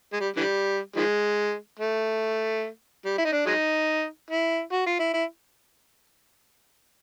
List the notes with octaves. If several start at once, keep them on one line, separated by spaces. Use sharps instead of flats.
G#3
G3
D3 E3 G3
D#3 F3 G#3
A3
G3
E4
D#4
D4
F#3 G#3 D#4
E4
F#4
F4
E4
E4